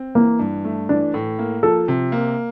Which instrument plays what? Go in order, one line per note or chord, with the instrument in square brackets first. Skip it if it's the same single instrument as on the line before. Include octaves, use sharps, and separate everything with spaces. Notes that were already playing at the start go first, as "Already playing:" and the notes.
Already playing: [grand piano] C4
[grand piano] E3 [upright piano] A#3
[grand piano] G2
A3
[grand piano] E3 [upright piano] D4
[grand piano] A2
A#3
[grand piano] F3 [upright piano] A4
[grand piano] C3
A#3